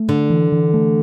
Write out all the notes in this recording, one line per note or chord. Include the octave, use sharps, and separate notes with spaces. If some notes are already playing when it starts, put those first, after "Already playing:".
Already playing: A3
D3 D4
E3
E3
A3